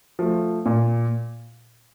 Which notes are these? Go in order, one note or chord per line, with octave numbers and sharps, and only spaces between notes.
F3 A3
A#2